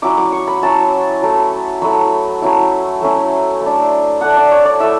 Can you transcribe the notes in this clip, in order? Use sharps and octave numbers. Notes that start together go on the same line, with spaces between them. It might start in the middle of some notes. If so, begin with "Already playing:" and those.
F#3 C#4 E4 D6
D6
C#6
B5
F#3 C#4 E4 A5
F#3 A3 E4
F#3 A3 E4 B5
F#3 A3 C#4 E4
F#3 A3 C#4 E4
A3
D4
A3 D4 F#5
D5
C#5
D5
A3 E4 E5